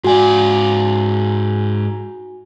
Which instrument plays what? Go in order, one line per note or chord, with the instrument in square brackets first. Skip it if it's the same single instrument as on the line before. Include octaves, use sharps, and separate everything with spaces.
[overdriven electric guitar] G#2 D5 [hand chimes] F#4 G#5